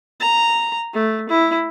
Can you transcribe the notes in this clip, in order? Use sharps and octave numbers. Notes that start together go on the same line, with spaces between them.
A#5
A3
E4